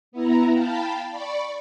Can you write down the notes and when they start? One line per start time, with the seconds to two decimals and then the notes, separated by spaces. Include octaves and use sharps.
0.12 B3 E4 A#5
0.53 F5 G5 A5 B5
1.10 D5 B5 C#6